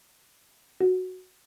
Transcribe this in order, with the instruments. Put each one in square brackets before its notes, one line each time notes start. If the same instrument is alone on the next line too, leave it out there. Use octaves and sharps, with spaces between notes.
[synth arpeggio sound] F#4